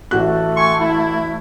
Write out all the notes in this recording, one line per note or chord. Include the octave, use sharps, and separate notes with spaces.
A1 A3 F#4 F#6
G#5 C6 C#6
E4